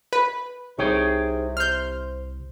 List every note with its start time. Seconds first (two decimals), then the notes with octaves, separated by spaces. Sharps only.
0.13 B4
0.78 C2 C3 D#4 G#4 C#5 G5
1.57 C5 F6 G6